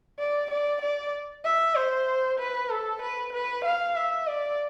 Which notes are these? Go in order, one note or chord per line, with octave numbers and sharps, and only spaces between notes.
D5
D5
D5
E5
C5
B4
A4
B4
B4
F5
E5
D5